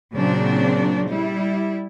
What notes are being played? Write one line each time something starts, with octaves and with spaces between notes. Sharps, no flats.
A#2 C#3 F#3 C4 D4
G3 E4